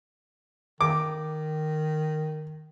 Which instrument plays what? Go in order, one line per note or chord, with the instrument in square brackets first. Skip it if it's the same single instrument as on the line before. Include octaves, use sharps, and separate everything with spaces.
[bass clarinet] D#3 [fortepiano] D6